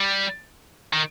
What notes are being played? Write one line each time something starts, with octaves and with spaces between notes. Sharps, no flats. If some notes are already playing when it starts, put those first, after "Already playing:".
Already playing: G3
D#3